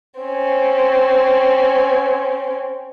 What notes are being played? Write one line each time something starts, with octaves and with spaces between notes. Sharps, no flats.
C4 C#4